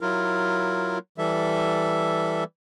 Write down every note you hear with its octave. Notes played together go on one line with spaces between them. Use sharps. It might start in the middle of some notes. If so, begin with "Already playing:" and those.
F#3 E4 F4 A#4
E3 G3 A4 E5